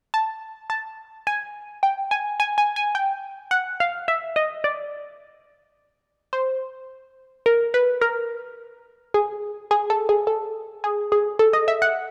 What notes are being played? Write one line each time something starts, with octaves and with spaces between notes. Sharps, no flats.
A5
A5
G#5
G5
G#5
G#5
G#5
G#5
G5
F#5
F5
E5
D#5
D5
C5
A#4
B4
A#4
G#4
G#4
A4
G#4
A4
G#4
G#4
A4
D#5
E5
F#5